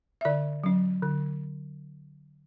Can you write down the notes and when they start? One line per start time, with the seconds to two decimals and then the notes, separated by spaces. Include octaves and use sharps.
0.21 E5
0.25 D3 D5
0.64 F#3 C#4
1.02 D3